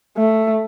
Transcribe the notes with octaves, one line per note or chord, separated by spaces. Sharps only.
A3